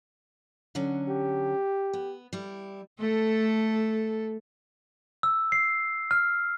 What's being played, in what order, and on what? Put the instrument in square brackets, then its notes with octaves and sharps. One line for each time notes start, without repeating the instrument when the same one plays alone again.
[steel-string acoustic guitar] D3 F#3 C#4
[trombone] G4
[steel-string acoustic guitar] B3
G3 E4
[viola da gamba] A3 A4
[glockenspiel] E6
C7
F6